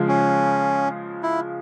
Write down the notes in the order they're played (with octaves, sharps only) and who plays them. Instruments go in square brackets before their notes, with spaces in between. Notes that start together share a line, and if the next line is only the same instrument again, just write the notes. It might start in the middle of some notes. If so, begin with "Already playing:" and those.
Already playing: [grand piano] C#3 F3 G#3
[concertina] C#4
E4